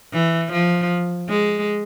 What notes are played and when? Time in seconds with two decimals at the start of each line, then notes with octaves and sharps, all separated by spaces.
0.13 E3
0.52 F3
1.30 G#3